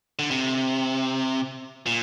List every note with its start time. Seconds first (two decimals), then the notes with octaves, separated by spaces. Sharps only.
0.19 D3
0.31 C3
1.86 A#2